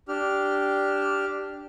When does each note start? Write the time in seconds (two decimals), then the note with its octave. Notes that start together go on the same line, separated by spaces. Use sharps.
0.08 D4 G4 F6